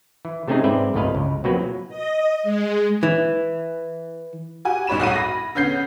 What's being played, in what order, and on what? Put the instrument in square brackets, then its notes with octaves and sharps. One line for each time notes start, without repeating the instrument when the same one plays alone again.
[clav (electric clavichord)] E3
C3 A3 C4 C#4 D#4 G#4
G#2 C4 B4 D5 E5
G1 C2 A2 B4 D#5 F5
C#2
B2 F3 F#3 A#3 C4 B4
[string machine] D#5
G#3
[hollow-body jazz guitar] E3
[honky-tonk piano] F#4 G4 G#5
C2 G#2 C#5 B5 E7
C2 A2 F#4 D#7
B5 A#6
D3 B3 C#4 G6 C7